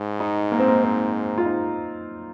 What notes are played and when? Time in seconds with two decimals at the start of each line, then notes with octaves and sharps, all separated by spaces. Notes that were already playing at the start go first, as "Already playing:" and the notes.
Already playing: G#2
0.20 D#4
0.52 A#3
0.59 C4
0.68 A#3
0.83 C4
1.38 F4
1.46 D#4